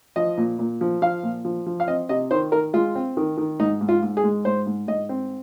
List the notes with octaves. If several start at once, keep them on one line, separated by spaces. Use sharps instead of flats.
F3 D#5
A#2
A#2
F3
F3 F5
A#2
F3
F3
F5
C4 D#5
C3 D#5
D#3 C5
D#3 A#4
G#3 F4
C4
D#3
D#3
G#2 D#4
G#2
F4
G#2
G#4
G#3
G#2 C5
G#2
G#2 D#5
C4